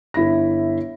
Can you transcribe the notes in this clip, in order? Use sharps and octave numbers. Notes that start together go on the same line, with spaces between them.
G1 E4 B5 A#6